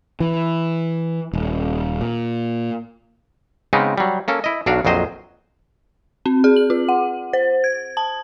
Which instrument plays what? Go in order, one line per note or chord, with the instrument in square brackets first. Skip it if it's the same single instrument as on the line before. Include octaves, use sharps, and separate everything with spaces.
[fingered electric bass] E3
D#1
A#2
[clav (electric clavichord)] C#3 G#3 B3 C4 D#4
F#3 G3
A#3 C#4 A4
E4 D#5
B1 F#3 D4 F#4 F5
A#1 F2 F#3 C5 D#5
[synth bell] C4
G#4
F#7
F4
F#5
C5
G#6
A5